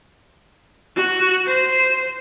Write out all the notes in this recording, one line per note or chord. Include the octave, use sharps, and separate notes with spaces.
F#4
C5